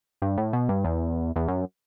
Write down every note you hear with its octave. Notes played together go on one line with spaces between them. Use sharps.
G2
A2
B2
G2
E2
E2
F#2